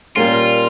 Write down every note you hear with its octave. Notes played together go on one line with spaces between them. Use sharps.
A#2 G3 A#3 C#4 F4